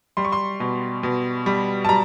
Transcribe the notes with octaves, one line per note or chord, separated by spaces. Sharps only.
G3 C6
C#6
C6
B2
B2
G3
A5
G3 A#5